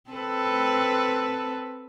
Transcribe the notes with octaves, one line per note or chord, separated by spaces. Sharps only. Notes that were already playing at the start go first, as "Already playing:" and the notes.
C4 A4 B4